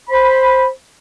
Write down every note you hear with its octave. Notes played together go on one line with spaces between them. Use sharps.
C5 B5